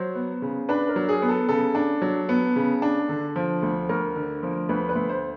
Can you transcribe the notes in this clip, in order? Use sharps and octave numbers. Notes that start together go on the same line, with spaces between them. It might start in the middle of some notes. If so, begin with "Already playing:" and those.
Already playing: F#3 C5
B3
C#3
D4 B4
A#4
F#3
G#4
B3
A4
C#3 A4
D4
F#3
B3
C#3
D4
D3
F3
D2
D2 A#4
D3
F3
D2 B4
B4
D2
C5